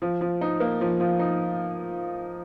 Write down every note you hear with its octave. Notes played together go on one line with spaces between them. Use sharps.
F3
F3
D#4
A#3
F3
F3
D#4